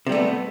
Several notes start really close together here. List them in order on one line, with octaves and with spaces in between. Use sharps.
C3 G3 A3 B3